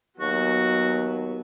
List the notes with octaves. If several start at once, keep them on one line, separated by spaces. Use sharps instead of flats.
D#2 F#3 B3 F#4